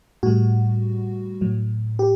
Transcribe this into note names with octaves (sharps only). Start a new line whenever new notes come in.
A2 G3 F#4
A2 F#3
G4